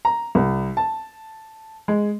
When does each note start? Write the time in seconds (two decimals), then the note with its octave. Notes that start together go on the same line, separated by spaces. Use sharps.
0.05 A#5
0.35 C2
0.77 A5
1.88 G#3